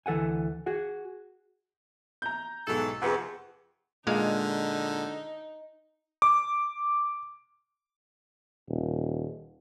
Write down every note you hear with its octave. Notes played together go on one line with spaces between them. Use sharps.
D2 E3 A4 F#5 G#5
F#4 G#4 F#5
A#5 G6
B1 G#2 E3 F#3 A4
F2 C3 G#4 B4 F#5
A#2 D3 G#3 D#4 F5
D6
D#1